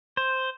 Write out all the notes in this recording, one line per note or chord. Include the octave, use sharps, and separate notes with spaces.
C5